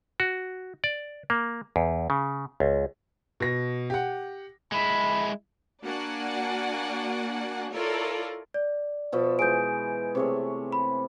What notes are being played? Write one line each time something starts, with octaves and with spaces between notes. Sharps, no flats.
F#4
D5
A#3
E2
C#3
C#2
B2 A#6
G4 F#5
G#3 E4 B5
A#3 D4 F#4 D5 F#5 G#5
E4 F4 A4 A#4 C#5 D5
D5
B2 F3 E5
E3 G#3 G#4 G6 D7
C3 A3 G#4 C#5
B5